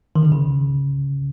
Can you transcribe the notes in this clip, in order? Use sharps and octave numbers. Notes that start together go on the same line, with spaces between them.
D#3
D3
C#3